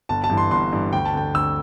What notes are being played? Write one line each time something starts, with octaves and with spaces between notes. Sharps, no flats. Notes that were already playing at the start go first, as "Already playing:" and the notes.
G1 A5
A5
G2 E3
C6
G1 C6
G2 E3
D2 G5
A5
D3 G5
D2 E6